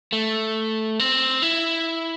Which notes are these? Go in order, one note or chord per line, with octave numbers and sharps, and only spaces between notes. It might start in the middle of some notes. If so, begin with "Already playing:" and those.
A3
C4
E4